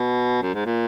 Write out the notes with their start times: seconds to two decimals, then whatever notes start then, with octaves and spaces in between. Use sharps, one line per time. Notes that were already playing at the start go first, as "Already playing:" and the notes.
Already playing: B2
0.42 F#2
0.54 G#2
0.66 A#2